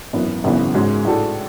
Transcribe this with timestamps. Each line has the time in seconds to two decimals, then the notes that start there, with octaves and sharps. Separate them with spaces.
0.13 G#1 F#2 E3 B3
0.44 G#1 F#2 C#3 E3 B3
0.74 G#2 G#3 C#4 F#4
1.05 A2 G#3 D4 F#4 A4